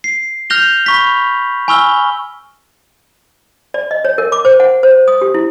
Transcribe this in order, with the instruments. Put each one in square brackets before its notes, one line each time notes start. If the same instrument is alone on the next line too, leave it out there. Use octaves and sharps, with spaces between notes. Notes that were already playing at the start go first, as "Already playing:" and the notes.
[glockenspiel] C7
F6 G6 A#6 F7 G7
B5 C#6 B6
G#5 B5 C#6 E6 F6 G7
[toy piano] D5
D#5
C#5
A#4
D6
C5
F#5
C5
D#6
G4
E4